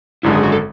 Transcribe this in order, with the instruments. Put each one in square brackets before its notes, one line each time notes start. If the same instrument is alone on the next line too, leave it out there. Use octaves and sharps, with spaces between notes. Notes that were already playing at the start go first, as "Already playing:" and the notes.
[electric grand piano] G#1 F#2 D3 G#3 [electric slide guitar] E4
[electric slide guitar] G#4
F#4
A4